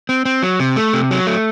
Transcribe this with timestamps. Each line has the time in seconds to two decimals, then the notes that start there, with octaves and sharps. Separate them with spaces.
0.09 C4
0.25 C4
0.43 F#3
0.60 C3
0.76 A3
0.93 C3
1.11 F#3
1.27 A3